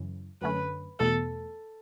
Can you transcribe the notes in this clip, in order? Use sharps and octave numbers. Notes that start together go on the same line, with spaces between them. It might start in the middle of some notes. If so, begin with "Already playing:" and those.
Already playing: F#2 C#3 E3
F#2 D3 A3 C#4 B4
E2 B2 A3 A4